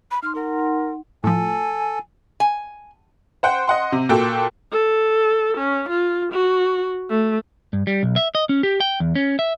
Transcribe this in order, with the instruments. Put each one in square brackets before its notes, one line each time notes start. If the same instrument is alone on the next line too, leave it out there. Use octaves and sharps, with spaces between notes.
[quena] B5
[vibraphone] D#4 C6 [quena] F6
[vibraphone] D#4 F#5 C6 [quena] A#4
[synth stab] A2 F3 [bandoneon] A4 [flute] G#5
[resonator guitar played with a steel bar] G#5
[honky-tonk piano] C5 F#5 G5
D#5 F#5 C6
C3
A#2 F#4 A4 G5
[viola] A4
C#4
F4
F#4
A3
[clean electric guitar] G2
G3
B1
E5
D#5
C#4
G4
G5
E2
C#4
E5